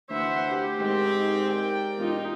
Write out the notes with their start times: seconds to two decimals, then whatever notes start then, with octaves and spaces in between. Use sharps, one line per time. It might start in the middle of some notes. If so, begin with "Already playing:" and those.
0.10 D2 E3 B4 C5 E5 F#5
0.50 G4
0.79 G#2 D#3 C4
1.48 A#4 D5 G5
1.98 E1 D#4 F4